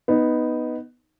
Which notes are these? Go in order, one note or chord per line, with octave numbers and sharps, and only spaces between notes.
B3 D#4